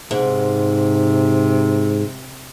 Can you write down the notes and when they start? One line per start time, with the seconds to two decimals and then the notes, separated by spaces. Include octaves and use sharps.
0.11 G#2 C3